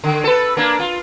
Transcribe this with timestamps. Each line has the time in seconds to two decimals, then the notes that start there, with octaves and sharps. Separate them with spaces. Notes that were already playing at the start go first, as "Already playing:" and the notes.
0.04 D3
0.24 A4 B4
0.57 A#3 D4
0.79 F4